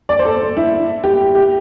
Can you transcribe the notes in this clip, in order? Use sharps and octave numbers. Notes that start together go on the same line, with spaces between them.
D5
C5
A4
E4
G4
G4